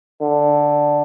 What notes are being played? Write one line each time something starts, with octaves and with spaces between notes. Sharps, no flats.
D3